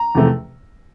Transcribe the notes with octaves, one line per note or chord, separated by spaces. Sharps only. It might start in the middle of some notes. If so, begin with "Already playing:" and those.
Already playing: A#5
E2 C3 F3 A3